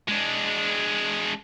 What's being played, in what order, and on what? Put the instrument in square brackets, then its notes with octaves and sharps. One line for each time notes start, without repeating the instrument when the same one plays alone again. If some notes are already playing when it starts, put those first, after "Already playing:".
[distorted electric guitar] G#3 D4